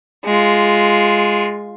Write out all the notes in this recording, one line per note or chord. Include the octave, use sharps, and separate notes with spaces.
G#3 F4